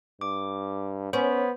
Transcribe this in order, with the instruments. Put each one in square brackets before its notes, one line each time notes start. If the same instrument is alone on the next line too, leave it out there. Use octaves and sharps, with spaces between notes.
[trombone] G2 [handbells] D6
[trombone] B3 [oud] C#4 [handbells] C5